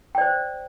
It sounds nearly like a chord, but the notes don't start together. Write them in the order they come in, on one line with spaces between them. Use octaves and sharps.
G5 D5 C5